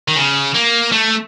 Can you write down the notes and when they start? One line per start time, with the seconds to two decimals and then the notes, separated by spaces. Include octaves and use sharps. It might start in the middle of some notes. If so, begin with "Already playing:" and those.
0.08 D#3
0.16 C#3
0.55 A#3
0.92 A3